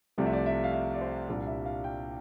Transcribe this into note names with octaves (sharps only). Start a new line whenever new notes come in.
C2 C3 F3 A3 D5
E5
D5
E5
F5
E5
D5
C5
C2 A#2 G3 D4 D5
E5
F5
G5